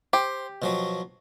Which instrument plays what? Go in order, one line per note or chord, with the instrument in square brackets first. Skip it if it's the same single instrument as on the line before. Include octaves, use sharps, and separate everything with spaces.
[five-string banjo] G4 [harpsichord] C5
[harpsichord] B2 F3 F#3